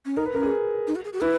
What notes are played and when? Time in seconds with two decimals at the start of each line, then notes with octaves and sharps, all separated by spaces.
0.06 C#4
0.17 D#4 A#4
0.26 B4
0.34 C#4 A#4
0.43 G#4
0.87 D#4
0.96 F#4
1.04 G#4
1.13 F#4
1.21 E4 B4